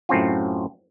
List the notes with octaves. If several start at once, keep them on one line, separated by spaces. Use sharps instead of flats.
F#2 A2 C4 C#4 F4